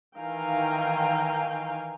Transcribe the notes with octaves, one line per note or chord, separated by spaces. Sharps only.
D#3 E3 F5 G5 G#5 A#5